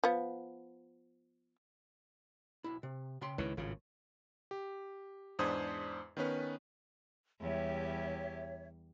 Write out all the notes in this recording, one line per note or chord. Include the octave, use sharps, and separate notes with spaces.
F3 B3
B1 E4
C3
C#3 G5 C6
C#2 D#3 E4 B4 C#5
G#1 A2 C#3 F4
G4
E2 G#2 D4 C5 D#6 G#6
D#3 B3 C#4 B4
E2 G3 G4 C#5 E5